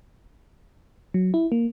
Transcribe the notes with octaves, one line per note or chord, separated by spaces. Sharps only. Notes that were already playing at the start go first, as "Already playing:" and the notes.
F#3
E4
A#3